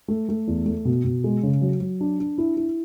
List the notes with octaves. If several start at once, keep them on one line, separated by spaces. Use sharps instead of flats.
A3
A3
E2
A3
B2
B2
G#3
C#3
F#3
F#3
D4
D4
E4
E4